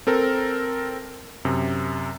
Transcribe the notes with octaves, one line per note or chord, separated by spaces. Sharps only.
C4 A4 A#4
F#2 C3